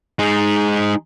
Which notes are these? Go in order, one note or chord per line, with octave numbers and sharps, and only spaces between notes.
G#3 D#4